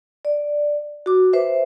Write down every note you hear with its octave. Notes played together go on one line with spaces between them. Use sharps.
D5
F#4 D6
B4 C5 E5